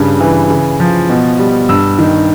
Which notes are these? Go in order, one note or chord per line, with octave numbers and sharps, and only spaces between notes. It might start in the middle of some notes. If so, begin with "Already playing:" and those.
Already playing: G2 C#3
E3
C#3
F3
B2
G3
G2 E6
D#3